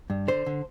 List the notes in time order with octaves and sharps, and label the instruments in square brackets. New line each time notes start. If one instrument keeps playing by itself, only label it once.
[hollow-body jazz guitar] G2
D3 C5
D3